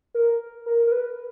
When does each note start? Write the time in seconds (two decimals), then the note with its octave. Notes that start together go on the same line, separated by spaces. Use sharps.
0.14 A#4
0.66 A#4
0.87 A#4
0.92 B4